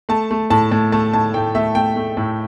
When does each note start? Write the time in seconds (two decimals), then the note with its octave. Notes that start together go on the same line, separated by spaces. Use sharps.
0.09 A3 A5
0.31 A3
0.50 A2 A5
0.71 A2
0.92 A3 A5
1.13 A2 A5
1.34 A2 G5
1.55 A3 E5
1.75 A3 G5
1.96 A3
2.17 A2